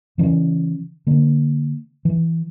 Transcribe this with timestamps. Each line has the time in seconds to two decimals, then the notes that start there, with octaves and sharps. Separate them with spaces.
0.18 C#3 E3 C#4
1.07 D3 A#3
2.05 E3